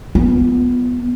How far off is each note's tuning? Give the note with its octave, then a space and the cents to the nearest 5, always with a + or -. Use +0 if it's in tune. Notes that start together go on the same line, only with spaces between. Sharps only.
B3 +0 F4 +0